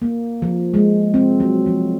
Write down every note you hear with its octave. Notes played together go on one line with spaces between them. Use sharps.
A#3
F3
G#3
C4
F#3
F3